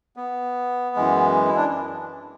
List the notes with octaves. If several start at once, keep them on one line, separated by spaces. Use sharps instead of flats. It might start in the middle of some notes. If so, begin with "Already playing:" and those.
B3
F#2 E3 G#3
E4
D4